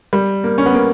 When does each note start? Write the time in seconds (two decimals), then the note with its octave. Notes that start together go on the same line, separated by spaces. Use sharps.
0.13 G3
0.44 A#3
0.58 C#4
0.66 B3
0.74 A#3